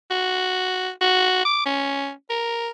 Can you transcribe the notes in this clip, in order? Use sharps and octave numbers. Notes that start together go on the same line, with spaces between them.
F#4
F#4
D6
C#4
A#4